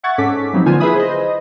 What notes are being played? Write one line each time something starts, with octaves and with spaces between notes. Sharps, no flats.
E5 F#5 C#6 G#6 A6
G#2 C#4 A4 D6 B6
F3 F#3 A3 B3 C4 D#4
D3 A#3 B3 F4 C5 G#5
E4 G#4 B4 E5 B5 D#6
C5 D#5